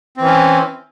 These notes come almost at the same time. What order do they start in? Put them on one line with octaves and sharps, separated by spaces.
C4 E3 C#4